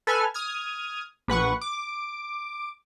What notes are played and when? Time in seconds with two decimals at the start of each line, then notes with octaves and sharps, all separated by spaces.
0.07 A4 B4 G#5 F6
0.34 D#6 F6 G#6
1.28 A#1 B4 F#5 C#6
1.61 D6